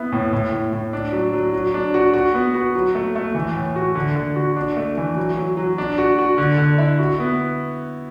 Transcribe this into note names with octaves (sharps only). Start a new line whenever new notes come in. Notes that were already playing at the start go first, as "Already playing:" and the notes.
Already playing: B3 E4
A2
A2
A2
A2
D4
F#3
F#3
F#3
D4
F#4
F#4
B3
F#4
F#3
A3
A3
E3
A2
F#4
D3
D3
F#4
D4
A3
E3
F#3
F#3
F#3
D4
F#4
F#4
D3
D3
E4
F#4
B3